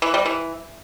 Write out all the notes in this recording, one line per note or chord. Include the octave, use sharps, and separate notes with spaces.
E3
G3
E3